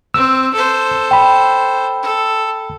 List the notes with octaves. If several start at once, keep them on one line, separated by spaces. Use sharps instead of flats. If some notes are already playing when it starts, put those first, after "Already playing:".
C4 E6
A4 C5
G5 B5
A4